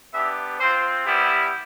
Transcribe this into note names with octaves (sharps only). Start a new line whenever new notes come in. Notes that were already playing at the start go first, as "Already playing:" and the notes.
B3 D4 G4 E5
C4 F4 C5
G3 B3 E4 G4